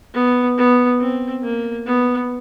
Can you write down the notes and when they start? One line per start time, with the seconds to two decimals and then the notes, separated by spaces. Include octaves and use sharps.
0.14 B3
0.57 B3
1.00 C4
1.43 A#3
1.86 B3